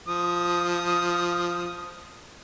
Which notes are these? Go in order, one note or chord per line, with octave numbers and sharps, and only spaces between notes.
F3 D#6